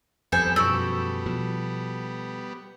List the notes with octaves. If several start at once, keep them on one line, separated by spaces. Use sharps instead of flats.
F2 G3 B3 A4 C5 G#5
F#2 B2 F3 F#4 A4 D5 E6
B2 F3